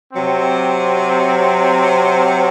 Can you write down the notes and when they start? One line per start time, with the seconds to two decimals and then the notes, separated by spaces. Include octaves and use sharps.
0.13 C3 F#3 C4